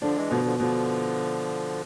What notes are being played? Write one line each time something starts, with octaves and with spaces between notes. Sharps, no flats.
D3 F3 D4
E3 G#3
B2 D3 F3
D3 F3
B2 D3 F3